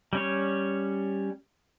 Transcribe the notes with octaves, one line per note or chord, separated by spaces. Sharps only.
G3 C#4 C#5